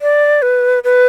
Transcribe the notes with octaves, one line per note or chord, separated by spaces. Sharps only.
D5
B4
B4